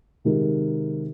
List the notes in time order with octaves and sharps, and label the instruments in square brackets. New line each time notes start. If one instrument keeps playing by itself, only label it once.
[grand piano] C3 D#3 G#3 D#4 A#4